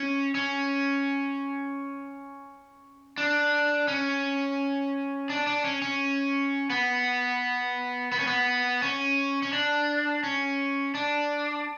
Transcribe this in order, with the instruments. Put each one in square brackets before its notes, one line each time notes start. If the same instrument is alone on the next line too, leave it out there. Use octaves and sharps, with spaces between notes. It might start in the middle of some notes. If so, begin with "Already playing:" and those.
Already playing: [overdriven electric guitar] C#4
C#4
D4
C#4
D4
D4
C#4
C#4
B3
B3
C#4
B3
C#4
C#4
D4
C#4
D4